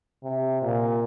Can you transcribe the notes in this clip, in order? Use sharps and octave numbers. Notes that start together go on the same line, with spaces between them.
C3
A#2